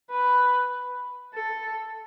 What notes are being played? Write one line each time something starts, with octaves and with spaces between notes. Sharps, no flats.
B4
A4